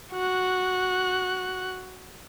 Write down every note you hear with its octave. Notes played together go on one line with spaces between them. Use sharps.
F#4 F#6